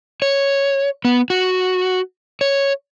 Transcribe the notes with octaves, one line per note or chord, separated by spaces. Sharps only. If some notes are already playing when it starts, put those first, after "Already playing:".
C#5
B3
F#4
C#5